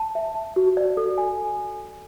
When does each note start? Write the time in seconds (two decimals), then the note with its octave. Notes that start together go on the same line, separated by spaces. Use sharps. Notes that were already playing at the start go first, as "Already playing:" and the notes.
Already playing: A5
0.15 E5
0.35 A5
0.56 F#4
0.77 D5
0.97 A4
1.18 G#5